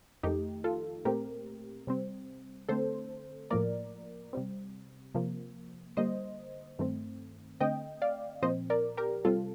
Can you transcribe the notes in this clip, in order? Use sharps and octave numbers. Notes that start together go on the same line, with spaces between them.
F2 D#3 A3 D#4 G4
F4 A4
A#2 A3 C4 G4 A#4
C3 G3 C4
D3 A3 C4 A4 C5
A2 F3 A#3 A#4 D5
C3 G3 C4
C3 F3 A#3
D3 G3 A#3 C5 D#5
G2 D#3 A3 C4
D3 A3 C4 D#5 G5
D5 F5
A#2 F3 C4 C5 D#5
A#4 D5
G4 A#4
C3 G3 C4 F4 A4